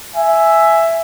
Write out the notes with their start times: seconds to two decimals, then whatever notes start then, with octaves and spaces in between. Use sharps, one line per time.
0.16 E5 G#5